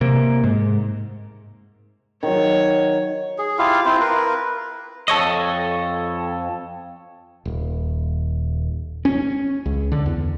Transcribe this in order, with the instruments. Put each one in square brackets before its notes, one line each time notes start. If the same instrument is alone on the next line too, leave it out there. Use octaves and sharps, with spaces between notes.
[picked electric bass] C3 A#3
G#2
[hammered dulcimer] D#3 F#3 [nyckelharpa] C#5
[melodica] G#4
E4 F4 G4 F5
C4 E4 F4 C5
A#4 B4
[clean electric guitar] F2 A4 C#5 D#5
[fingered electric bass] D#1
C#4
C#2
D3
E2